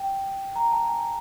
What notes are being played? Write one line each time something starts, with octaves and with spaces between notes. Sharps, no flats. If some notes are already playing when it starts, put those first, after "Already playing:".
Already playing: G5
A#5
A5
G#5